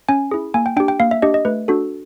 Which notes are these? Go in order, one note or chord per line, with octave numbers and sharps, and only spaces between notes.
C#4 G#5
E4 G#4
A#3 G#5
G5
D4 G4 G5
G5
A#3 F5
E5
D4 G4 D#5
D#5
A3 B4
D4 F#4 A4